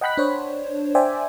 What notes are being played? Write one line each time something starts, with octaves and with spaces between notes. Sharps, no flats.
D#5 F#5 G5 B5 F#6 B6
D4 C5 C#5
C5 D5 E5 G5 G#5